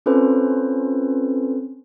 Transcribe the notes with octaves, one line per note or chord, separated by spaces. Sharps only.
C4 C#4 F4 A4 B4 C5